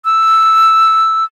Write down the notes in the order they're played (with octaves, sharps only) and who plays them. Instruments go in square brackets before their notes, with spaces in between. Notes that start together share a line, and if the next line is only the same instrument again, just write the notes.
[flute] E6